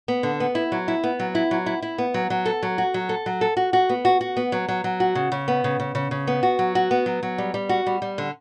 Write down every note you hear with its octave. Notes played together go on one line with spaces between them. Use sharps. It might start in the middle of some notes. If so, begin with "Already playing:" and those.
B3
D3
B3
E4
F#3
E4
B3
F#3
E4
F#3
E4
E4
B3
F#3
F#3
A4
F#3
F#4
F#3
A4
F#3
A4
F#4
F#4
B3
F#4
F#4
B3
F#3
F#3
F#3
F#4
C#3
C#3
B3
C#3
C#3
C#3
C#3
B3
F#4
F#3
F#4
B3
F#3
F#3
G3
G3
F#4
G3
G3
D3